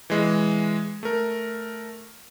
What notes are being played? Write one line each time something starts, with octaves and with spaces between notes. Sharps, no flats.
E3 G#3
A3 A#4